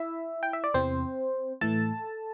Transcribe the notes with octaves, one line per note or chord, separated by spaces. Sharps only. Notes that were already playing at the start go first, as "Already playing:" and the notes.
Already playing: E4 E5
G5
E5
D5
E2 C3 E3 C4 C5
A2 E3 A3 A4 A5